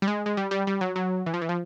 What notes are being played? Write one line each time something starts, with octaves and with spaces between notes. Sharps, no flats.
G3
G#3
G#3
G3
G3
G3
F#3
F#3
E3
F3
E3
F3